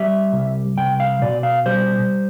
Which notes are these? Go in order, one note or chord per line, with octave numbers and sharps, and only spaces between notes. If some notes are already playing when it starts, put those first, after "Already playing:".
Already playing: G3 E5
C2
C2 G5
F5
B2 D5
F5
G3 C5